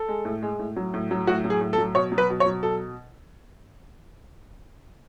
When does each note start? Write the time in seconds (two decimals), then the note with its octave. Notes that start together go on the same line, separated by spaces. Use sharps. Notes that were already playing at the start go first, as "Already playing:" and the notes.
Already playing: A4
0.08 G#3
0.25 A2
0.42 G#3
0.59 A2
0.76 F#3
0.94 A2
1.11 F#3
1.27 A2 F#4
1.44 F#3
1.50 G#4
1.61 A2
1.73 A4
1.78 F#3
1.95 B2 C#5
2.12 F#3
2.18 B4
2.30 B2
2.40 C#5
2.46 F#3
2.63 B2 A4